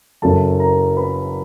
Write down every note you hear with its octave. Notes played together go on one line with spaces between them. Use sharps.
F#1 F#2 C#3 F#3 A4 A5
A#4 A#5
B4 B5